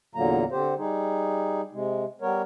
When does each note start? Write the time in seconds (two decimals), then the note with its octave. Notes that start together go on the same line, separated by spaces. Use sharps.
0.15 E2 A#2 D3 F#3 A#3 A#5
0.51 D3 C4 G4 C5
0.78 G3 D#4 G#4
1.72 C3 G#3
2.21 G3 B3 A#4 C#5